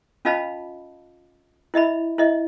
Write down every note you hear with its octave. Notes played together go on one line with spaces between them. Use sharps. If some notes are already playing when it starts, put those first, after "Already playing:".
C#4 F4 D#5 F5 A5 B5
E4 D#5 E5 B5
E4 D#5 E5